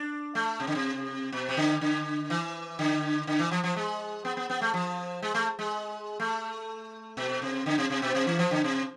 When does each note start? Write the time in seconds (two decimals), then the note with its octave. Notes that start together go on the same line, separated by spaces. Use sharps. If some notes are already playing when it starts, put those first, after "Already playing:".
Already playing: D4
0.35 A3
0.60 C3
0.67 D3
0.75 C3
1.32 B2
1.49 C3
1.57 D3
1.81 D3
2.30 E3
2.79 D3
3.27 D3
3.39 E3
3.51 F3
3.64 F3
3.76 G#3
4.25 B3
4.37 B3
4.50 B3
4.61 A3
4.74 F3
5.22 G#3
5.34 A3
5.59 G#3
6.20 A3
7.17 B2
7.42 C3
7.66 D3
7.78 C3
7.90 C3
8.02 B2
8.15 C3
8.27 E3
8.39 F3
8.51 D3
8.64 C3